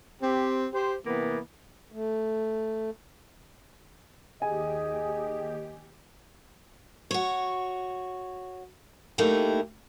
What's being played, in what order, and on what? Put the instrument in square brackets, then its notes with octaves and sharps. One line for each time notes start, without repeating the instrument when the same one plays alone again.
[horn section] C4 G4
G4 C5
C3 E3 A#3 B3
[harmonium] A3
[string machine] D#2 G4 [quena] G#4 [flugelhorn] D#5 [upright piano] G#5
[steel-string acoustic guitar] F#4 C#5
A3 A#3 D#4 E4 G4